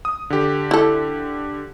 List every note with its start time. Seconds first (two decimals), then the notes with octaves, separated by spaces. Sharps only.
0.05 D#6
0.30 D3 G4
0.71 E4 A4